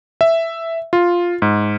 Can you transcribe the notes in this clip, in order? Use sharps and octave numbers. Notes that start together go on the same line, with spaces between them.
E5
F4
G#2